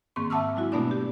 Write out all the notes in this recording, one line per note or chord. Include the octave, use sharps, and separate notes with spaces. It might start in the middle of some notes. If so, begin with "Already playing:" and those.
G#2 D#3 A#3 C4 C#6
E5 F#5 A5 D6 E6 F6
F#3 G#3 E4 F#4
B2 A3 B3 D4 D5 D6
G4